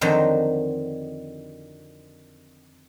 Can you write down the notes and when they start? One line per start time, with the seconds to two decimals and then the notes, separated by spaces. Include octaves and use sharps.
0.01 F2 D3 D#3 F#3 C5 A#5